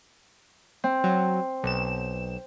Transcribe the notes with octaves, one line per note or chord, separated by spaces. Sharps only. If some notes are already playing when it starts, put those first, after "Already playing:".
C4
F#3
B1 E7